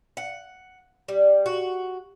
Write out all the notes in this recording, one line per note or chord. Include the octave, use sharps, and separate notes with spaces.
F#5
G3
F#4